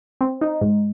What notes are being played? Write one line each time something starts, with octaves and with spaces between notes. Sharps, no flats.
C4
D#4
G#2